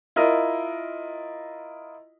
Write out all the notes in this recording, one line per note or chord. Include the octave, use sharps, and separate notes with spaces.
E4 F4 A#4 D#5